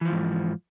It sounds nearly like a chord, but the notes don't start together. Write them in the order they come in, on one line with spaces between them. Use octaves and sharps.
E3 F3 F2 G#2